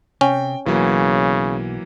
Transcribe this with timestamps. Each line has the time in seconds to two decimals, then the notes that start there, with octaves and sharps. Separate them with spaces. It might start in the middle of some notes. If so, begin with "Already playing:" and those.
0.21 C3 C#4 G5
0.66 B1 C#3 E3 F#3 A#3